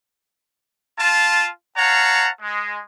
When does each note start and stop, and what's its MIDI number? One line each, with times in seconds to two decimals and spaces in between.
0.99 1.49 65
0.99 1.49 81
1.77 2.29 73
1.77 2.29 77
1.77 2.29 78
1.77 2.29 81
1.77 2.29 82
2.41 2.79 56